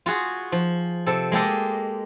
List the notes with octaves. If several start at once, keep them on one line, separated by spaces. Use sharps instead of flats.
F4 F#4 G#4
F3
C3 A4
G#3 A#3 G4 A4 D#5